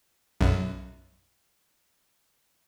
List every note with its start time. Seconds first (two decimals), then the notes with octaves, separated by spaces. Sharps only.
0.41 B1 F#2